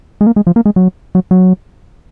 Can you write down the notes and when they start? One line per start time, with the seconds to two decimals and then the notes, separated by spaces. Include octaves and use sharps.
0.21 G#3
0.27 A#3
0.36 G#3
0.47 F3
0.56 A#3
0.66 G#3
0.76 F#3
1.15 F#3
1.31 F#3